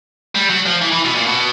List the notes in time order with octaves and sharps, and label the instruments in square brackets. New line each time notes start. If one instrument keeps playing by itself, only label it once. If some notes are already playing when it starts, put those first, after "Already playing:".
[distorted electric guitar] G3
F#3
F3
E3
E3
B2
A#2
B2